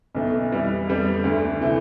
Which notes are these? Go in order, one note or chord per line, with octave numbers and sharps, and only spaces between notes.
B1 B2 A3
F2 E3 G3 B3 E4
F2 D3 G3 B3 D4
D2 D3 A3
C3 E3 A3